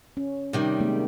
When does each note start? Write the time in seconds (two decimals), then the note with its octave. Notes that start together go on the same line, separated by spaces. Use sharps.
0.17 C#4
0.53 C3 D#3 G3
0.79 G#3 A#3